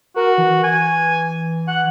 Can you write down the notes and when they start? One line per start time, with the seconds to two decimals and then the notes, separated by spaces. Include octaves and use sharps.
0.16 F#4 A#4
0.38 E3
0.63 G#5
1.68 F#5